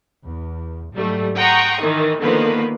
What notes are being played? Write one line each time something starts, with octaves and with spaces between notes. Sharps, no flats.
E2
G#2 F#3 G3 A3
F#5 G5 A#5 C6 C#6 D#6
D#3 E3 D#4
D3 D#3 F3 A#3 B3 B4